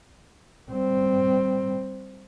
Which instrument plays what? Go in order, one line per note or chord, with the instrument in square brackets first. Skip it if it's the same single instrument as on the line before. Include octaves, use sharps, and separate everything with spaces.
[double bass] G3 C4